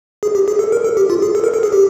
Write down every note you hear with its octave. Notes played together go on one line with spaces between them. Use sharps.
G#4
G4
G#4
A4
A#4
A4
G4
F4
G#4
A4
A#4
A4
G#4
G4